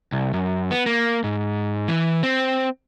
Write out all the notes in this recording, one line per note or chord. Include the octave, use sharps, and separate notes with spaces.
C2
F#2
B3
A#3
G#2
E3
C4